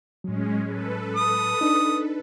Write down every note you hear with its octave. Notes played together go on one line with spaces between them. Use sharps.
A2 F#3 G#3 C#4
A4 B4
D#6
D4 D#4